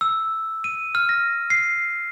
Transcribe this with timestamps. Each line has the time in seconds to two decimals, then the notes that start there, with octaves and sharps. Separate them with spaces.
0.01 E6
0.64 D#7
0.95 F6
1.09 A#6
1.50 C7